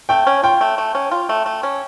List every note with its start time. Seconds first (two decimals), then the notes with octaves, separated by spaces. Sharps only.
0.09 A3 G5
0.27 C#4
0.43 F4 G5
0.61 A3
0.78 A3
0.95 C#4
1.11 F4
1.29 A3
1.46 A3
1.63 C#4